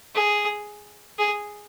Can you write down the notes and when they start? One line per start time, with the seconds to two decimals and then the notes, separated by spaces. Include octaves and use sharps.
0.15 G#4
1.18 G#4